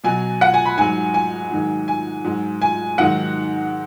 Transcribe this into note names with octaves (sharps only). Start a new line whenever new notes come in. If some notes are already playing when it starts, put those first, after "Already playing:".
B2 F#3 G#5
F#5
G#5
B5
G#2 F#3 G#5
G#5
G#2 D#3 F#3
G#5
G#2 F#3
G#5
G#2 D#3 F#3 F#5